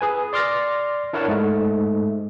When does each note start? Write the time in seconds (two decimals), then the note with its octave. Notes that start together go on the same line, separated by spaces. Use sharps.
0.01 G#4 B4 G#5
0.33 D5 C6 D6 F6 A6 A#6
1.13 D4 E4 A#4 C#5 F#5 A5
1.28 G#2 G#3 A3